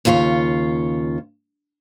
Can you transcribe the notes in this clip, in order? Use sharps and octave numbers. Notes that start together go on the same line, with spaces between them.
D#2 C#3 F4 B4 C#5